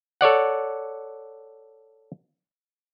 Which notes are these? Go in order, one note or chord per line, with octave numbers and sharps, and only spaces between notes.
A4 C#5 D5 F#5